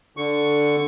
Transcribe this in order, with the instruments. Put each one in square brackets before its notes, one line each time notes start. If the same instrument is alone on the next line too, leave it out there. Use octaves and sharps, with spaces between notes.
[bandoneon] D3 C#6